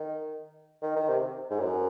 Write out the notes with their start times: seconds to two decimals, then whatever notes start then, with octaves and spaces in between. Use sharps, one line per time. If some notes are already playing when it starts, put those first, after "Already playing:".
Already playing: D#3
0.82 D#3
0.96 D#3
1.08 C3
1.50 G#2
1.59 F#2